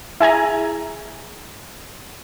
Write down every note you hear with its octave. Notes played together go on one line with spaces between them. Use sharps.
E4 G#4 G#5 A#5